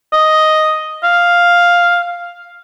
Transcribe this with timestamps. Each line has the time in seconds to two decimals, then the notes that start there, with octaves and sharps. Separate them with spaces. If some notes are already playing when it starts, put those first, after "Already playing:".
0.13 D#5
1.04 F5